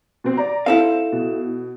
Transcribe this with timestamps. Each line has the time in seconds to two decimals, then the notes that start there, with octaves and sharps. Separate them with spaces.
0.24 B2 C4
0.37 D5 A#5
0.66 C4 E4 A4 F5
1.12 B2